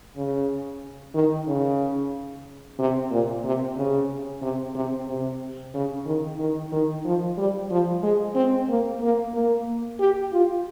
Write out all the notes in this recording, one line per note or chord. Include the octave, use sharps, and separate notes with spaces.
C#3
D#3
C#3
C3
A#2
C3
C#3
C3
C3
C3
C#3
D#3
D#3
D#3
F3
G3
F3
G#3
C4
A#3
A#3
A#3
G4
F4